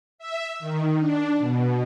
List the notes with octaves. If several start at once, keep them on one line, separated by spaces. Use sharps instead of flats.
E5
D#3
D4
B2